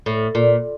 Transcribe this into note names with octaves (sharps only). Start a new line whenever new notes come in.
A2
A#2